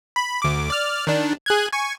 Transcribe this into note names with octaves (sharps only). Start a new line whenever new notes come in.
B5
D2 D6
D5 F6
D#3 D4
G#4 F#6 G#6
G#5 C#6